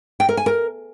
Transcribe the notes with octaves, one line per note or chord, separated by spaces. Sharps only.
G5
A#4
G#5
A#4